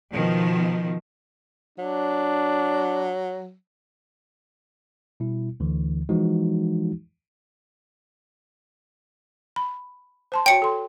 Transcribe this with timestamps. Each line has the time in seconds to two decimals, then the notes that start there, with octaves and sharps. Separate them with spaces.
0.12 B2 D#3 F3
1.78 F#3 D4
5.20 B2 G3 E4
5.60 D2 D3 E3
6.09 E3 F3 G#3 D#4 F#4
9.56 B5
10.32 C5 A5 C6
10.46 F#4 C#5 G5 C#7
10.62 A4 C6